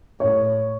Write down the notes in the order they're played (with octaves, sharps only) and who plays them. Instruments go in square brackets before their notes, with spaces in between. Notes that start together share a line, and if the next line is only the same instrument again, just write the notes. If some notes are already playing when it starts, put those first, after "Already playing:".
[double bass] A2 [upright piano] C#5